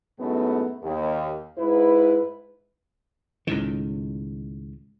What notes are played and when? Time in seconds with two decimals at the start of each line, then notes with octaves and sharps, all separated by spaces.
0.19 F#2 A2 G#3 A3 B3 D#4
0.83 D#2
1.58 G#2 E4 B4
3.47 C#2 A2 D#3